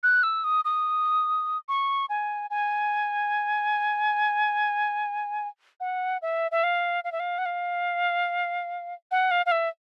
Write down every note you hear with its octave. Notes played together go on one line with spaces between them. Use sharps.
F#6
E6
D#6
D#6
C#6
G#5
G#5
F#5
E5
E5
F5
F5
E5
F5
F#5
F5
F#5
F5
F5
E5